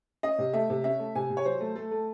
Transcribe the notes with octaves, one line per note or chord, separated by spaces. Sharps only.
C#4 D#5
C3
A3 E5
C3
C#4 E5
A3
C3 G#5
C3
C#5
F#3 C5
A3
A3 A4
A3